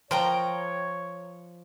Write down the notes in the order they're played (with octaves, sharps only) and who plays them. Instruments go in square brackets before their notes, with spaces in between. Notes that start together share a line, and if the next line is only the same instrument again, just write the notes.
[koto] F3 [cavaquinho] A#4 G5 A#5 [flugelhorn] C#5